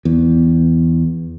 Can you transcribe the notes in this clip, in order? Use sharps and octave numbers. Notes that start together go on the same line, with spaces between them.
E2